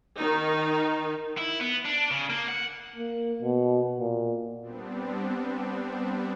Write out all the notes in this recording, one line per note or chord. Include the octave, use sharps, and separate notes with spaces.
D#3 D#4
E4
B3
D4
C#3
A#3
F#5
A#3
B2
A#2
G3 B3 C4 D4